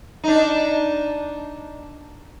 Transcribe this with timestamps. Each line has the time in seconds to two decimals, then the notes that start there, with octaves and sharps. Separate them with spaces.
0.24 D4 D#4